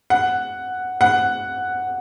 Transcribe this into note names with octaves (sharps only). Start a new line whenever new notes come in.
F#5
F#5